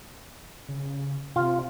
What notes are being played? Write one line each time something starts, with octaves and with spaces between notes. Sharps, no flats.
C#3
C3 F4